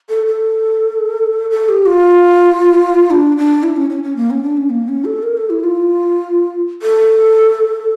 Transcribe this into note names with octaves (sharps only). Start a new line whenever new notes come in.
A4
A4
A4
G4
F4
D4
D4
E4
C#4
C#4
C#4
A#3
C#4
D4
C#4
A#3
C#4
A4
A#4
A4
E4
F4
A4